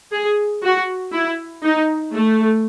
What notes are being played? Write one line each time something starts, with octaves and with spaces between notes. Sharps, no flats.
G#4
F#4
E4
D#4
A3